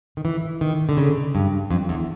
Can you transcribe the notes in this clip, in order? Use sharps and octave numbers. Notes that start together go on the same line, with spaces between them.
D#3
E3
D#3
D3
C#3
G2
F2
E2